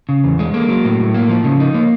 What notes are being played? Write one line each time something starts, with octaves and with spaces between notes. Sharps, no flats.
C#3
E2
G#3
A#3
F#3
A2
A2
A#3
F3
C#3
D#4
A#3